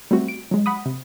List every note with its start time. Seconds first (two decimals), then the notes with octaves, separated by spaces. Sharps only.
0.11 G3 A3 C4 F#4
0.28 D7
0.51 F#3 G#3
0.66 F#5 B5 D#6
0.86 C3